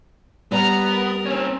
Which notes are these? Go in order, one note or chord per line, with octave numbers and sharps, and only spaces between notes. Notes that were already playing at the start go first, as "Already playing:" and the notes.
G3 B3 A#5 F6
A#4
C4 C#4